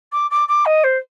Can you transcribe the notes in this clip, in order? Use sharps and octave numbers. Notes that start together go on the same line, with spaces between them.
D6
D6
D6
D#5
C5